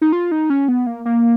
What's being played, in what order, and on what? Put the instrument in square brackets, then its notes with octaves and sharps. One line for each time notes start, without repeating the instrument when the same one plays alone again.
[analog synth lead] D#4
F4
D#4
C#4
B3
A#3
A#3